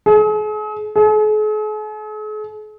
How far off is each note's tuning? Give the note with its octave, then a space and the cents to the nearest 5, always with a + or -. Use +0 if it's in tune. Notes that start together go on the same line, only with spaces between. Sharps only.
G#4 +40
G#4 +45